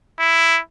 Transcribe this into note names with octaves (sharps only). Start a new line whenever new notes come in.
E4